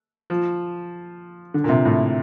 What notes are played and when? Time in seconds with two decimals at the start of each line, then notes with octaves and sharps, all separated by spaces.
0.30 F3
1.54 D3
1.64 A#2
1.69 C3
1.85 A2